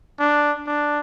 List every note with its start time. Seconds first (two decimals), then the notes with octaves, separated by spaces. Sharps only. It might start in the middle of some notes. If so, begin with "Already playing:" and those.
0.19 D4
0.67 D4